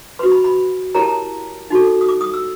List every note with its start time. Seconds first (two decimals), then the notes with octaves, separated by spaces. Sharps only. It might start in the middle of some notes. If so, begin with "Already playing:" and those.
0.19 F#4 B4 C6
0.32 B5
0.44 B5
0.95 E4 G4 A#4 C#5 A#5
1.02 A5
1.08 A#5
1.70 D#4 F#4 A4
2.01 D#6
2.09 D6
2.21 D#6
2.34 E6